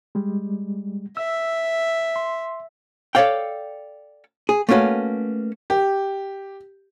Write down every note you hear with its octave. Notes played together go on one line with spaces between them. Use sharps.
G3 G#3
E5 E6
C6
A4 B4 C#5 D5 F5 G5
G#4
A3 A#3 C#4 F#4 B4
G4